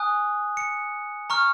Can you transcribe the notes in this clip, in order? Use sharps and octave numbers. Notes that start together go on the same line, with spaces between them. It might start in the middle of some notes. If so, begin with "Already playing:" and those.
Already playing: G#5 D#6 F#6
C#7
A#5 C#6 F6